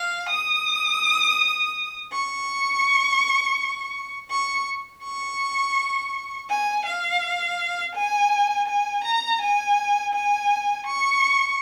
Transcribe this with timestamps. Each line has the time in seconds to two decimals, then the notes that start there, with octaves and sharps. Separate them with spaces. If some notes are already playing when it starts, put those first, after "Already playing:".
Already playing: F5
0.29 D#6
2.12 C#6
4.30 C#6
5.04 C#6
6.50 G#5
6.86 F5
7.95 G#5
8.68 G#5
9.05 A#5
9.42 G#5
10.14 G#5
10.87 C#6